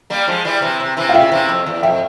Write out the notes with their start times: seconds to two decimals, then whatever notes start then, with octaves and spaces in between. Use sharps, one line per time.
0.10 G3 A#3
0.28 F3 G#3
0.45 E3 G3
0.62 C3 E3
0.80 C3
0.97 C3 E3
1.09 F5
1.14 C#3 E5 G5
1.32 C3 E3
1.49 F2
1.66 E2
1.83 F2 E5 G5